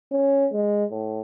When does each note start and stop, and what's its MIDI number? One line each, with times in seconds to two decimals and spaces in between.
0.12 0.47 61
0.53 0.85 56
0.91 1.21 45